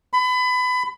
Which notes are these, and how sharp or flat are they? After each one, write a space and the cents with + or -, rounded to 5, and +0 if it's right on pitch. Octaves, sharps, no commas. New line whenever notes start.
B5 +25